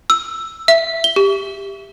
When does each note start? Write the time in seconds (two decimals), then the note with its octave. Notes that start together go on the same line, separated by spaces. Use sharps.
0.10 E6
0.68 E5
1.04 G7
1.16 G4